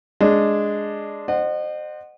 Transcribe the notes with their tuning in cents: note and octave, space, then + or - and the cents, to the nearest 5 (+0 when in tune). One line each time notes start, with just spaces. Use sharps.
G#3 +0 D4 +0
C5 +0 D#5 -35 F#5 +0